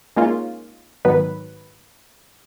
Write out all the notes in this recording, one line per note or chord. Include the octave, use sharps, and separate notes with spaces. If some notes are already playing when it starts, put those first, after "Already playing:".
G#3 A#3 C#4 D#4 F4
G#2 D#3 F#3 B3 B4